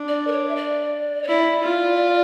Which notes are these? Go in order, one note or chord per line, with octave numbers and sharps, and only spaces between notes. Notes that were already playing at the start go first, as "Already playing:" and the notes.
Already playing: D4
D5
A#4
C#5
E5
D5
C#5
E4 D5
F4